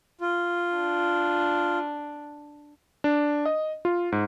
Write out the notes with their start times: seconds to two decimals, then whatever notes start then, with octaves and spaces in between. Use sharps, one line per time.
0.21 F4
0.75 D4
3.04 D4
3.46 D#5
3.85 F4
4.12 G#2